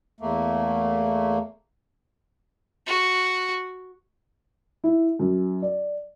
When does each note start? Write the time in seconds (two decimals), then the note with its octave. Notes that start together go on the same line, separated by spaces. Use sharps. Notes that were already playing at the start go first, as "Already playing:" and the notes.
0.20 E2 A3 A#3
2.87 F#4
4.84 E4
5.19 F#2
5.62 D5